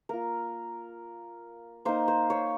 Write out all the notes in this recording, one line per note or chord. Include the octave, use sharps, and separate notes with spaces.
A#3 F4 A#4
A#3 D#4 C5
C5
C#5